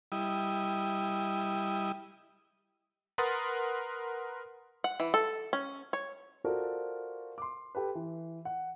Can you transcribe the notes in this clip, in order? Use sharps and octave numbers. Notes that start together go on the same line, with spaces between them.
G3 E4 D#5
A#4 B4 F#5 C6 D#6 A6
F#5
E3
A4
C#4
C#5
F4 F#4 A4 A#4 C5 D5
C6 D6
G4 A4 B4
E3
F#5